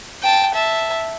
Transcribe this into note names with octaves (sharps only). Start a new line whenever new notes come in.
G5 A5
E5 A5